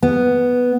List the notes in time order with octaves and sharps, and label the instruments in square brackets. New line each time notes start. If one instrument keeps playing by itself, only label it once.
[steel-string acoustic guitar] B3